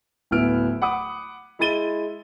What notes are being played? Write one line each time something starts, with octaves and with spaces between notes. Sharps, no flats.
D1 B3 E4 F6 D7
F#5 B5 D6 D#6
G#3 E4 B5 A6 D#7 G7